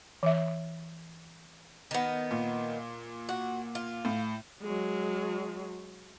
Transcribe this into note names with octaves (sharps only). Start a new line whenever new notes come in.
E3 E5
D#3 B3
A#2
F#4
F4
A2
F#3 G#3